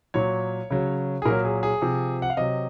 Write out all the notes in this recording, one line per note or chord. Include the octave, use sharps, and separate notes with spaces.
A#2 F#3 C#5
C#3 F#3
G#4
A#2 F#3 A#4
G#4
G#4
C3 F3
F#5
F5
C3 F#3 D#5